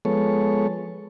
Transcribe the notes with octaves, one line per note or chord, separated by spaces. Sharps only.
F3 G#3 B3 A4 C#5